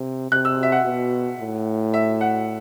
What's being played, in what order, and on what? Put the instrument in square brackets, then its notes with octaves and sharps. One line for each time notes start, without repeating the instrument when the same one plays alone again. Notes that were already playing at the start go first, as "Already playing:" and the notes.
Already playing: [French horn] C3
[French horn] C3 [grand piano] F#6
[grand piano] E6
E5
F#5
[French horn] B2
A2
[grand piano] E5
F#5